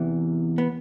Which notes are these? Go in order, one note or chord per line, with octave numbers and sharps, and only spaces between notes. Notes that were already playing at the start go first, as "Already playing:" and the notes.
Already playing: E2 C3 E3
B3